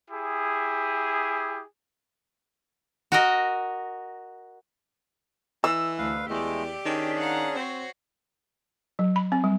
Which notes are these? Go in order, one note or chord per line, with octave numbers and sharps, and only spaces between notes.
E4 G4 G#4
F#4 A#4 D#5
E3 E6
D2 B4 F5
E2 G#3 A3 G4 D5
D#3 C#4 D4 G#4
F5 F#5 A#5
C4 F#4 C5 C#5
F#3
B5
C4
G3